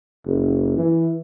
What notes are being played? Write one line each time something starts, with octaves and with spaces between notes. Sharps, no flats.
F#1
E3